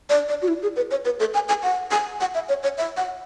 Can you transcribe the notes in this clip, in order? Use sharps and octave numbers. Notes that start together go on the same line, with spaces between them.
D5
D5
F#4
E4
G#4
B4
C#5
B4
A4
G#5
G#5
F#5
G#5
F#5
E5
C#5
C#5
E5
F#5